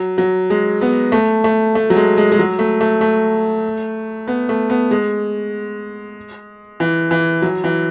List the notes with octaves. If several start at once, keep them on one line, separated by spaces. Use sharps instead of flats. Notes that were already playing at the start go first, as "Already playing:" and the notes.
Already playing: F#3
F#3
G#3
B3
A3
A3
A3
F#3
G#3
G#3
G#3
F#3
A3
A3
A3
B3
A3
B3
G#3
E3
E3
F#3
E3